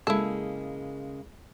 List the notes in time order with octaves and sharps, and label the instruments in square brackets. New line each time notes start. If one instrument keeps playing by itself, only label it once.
[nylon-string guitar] C#3 G#3 A#3 [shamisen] E4 A4